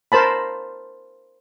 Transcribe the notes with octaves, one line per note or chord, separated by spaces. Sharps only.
A#4 C5 A5 B5